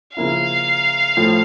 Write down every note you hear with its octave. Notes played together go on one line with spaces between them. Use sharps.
C#3 F3 A#3 E4 F5
A2 F3 A3